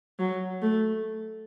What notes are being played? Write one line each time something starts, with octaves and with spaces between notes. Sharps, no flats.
F#3
A3